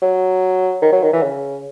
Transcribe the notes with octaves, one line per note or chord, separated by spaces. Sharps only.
F#3
D#3
F#3
D#3
E3
C#3